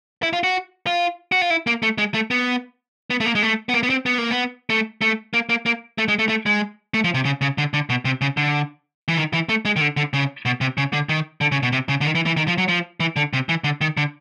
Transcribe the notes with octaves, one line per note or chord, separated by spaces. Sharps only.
E4
F4
F#4
F4
F#4
F4
E4
A#3
A3
G#3
A3
B3
B3
A3
A#3
G#3
A3
B3
A#3
B3
C4
B3
A#3
B3
A3
A3
A#3
A#3
A#3
A3
G#3
A3
A3
G#3
A3
F3
C3
C#3
C#3
D3
D3
B2
C3
C#3
D3
E3
D#3
E3
A3
G#3
D#3
D3
D3
C#3
B2
C3
C#3
D3
D#3
D3
C#3
B2
C3
C#3
D3
D#3
E3
E3
D#3
F3
F#3
F3
E3
D3
C3
E3
D3
D#3
D3